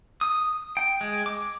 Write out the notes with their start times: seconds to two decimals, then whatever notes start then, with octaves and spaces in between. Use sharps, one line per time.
0.21 D#6
0.77 G5
1.01 G#3
1.26 D6